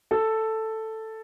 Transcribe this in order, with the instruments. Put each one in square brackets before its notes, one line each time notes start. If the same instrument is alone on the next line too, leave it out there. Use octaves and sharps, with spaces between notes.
[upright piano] A4